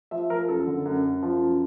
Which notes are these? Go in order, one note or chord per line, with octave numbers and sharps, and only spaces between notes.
F3 E5
F3 A#4
F#2 A4
D3
F#2
F#2
F3
F#2